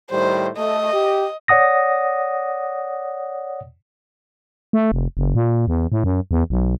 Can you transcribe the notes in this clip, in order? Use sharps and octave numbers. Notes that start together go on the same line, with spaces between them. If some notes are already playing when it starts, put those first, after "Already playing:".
A2 D#3 G3 C5
A3 D#5
G4
C#5 D5 F#5 D#6 A#6
A3
F1
F#1
A#2
E2
A2
F#2
E2
B1